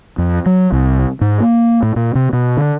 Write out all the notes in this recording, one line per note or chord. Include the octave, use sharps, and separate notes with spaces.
F2
F#3
C2
G#2
A#3
A2
A#2
C3
B2
D3